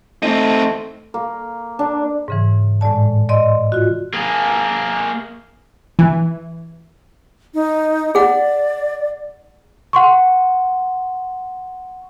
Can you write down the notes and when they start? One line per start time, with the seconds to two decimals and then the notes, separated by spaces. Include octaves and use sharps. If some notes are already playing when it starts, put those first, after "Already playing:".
0.23 A3 C4 D#4
1.14 A#3
1.79 D4
2.28 G#2 C#3 E3
2.81 A2 G#3 D5 A5
3.29 D5 D#5 C6
3.72 F4 F#4
4.14 A#3 G#4
5.99 E3
7.54 D#4
8.15 G#4 D5 F#5
9.93 F#5 C6 C#6